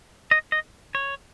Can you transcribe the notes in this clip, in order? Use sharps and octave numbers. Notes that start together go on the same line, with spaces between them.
D#5
D#5
C#5